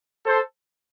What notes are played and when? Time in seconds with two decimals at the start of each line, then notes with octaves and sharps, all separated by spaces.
0.26 A4 C5